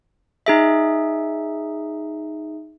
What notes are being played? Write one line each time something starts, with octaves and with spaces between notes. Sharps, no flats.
D#4 G#4 E5